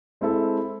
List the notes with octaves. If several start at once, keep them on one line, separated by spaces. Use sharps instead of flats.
G#3 C4 E4 A4